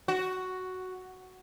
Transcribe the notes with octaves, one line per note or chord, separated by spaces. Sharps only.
F#4